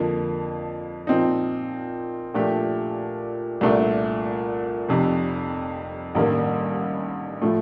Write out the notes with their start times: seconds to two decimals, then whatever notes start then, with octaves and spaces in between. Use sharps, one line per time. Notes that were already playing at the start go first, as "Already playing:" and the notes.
Already playing: F2 D3 F3 A#3
1.07 A#2 F3 C4 D#4
2.34 A#2 F3 A3 D4 G4
3.61 C2 A#2 A3 D4
4.88 F1 F2 C3
6.15 A1 G2 D#3 G3 A#3
7.42 A2 F3 A3